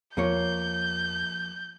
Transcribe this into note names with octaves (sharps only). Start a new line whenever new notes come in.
E2 F3 A#3 C#5 G6